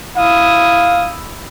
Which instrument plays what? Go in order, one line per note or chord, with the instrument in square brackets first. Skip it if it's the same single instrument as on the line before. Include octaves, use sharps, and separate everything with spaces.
[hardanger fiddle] E4 D#6 [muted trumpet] F5